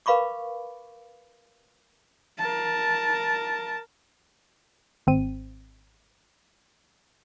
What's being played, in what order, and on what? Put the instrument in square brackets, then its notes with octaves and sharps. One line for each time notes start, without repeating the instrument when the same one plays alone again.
[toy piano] A#4 B4 F5 B5 C#6 D6
[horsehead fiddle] A#4 A5
[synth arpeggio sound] G#1 C4 D#7